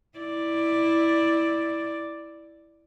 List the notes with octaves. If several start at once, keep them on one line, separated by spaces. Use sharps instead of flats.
E4 D5